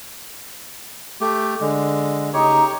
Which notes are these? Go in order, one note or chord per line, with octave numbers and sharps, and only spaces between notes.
A3 G4
D3 G#3
C#3 A3 D#4 G4 C#5